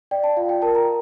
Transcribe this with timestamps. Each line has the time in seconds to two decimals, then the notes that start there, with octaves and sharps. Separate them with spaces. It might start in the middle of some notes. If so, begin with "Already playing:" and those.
0.11 D5 G5
0.24 A5
0.37 F4 F5
0.49 G5
0.62 A#4 A5
0.75 A#5